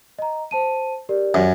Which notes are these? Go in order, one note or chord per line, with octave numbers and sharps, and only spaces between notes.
D#5 A#5
C5 A5 D#7
G4 A#4 D5
F#2